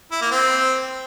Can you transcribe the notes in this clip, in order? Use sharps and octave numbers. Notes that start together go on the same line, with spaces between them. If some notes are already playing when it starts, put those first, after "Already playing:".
E4
A#3
C4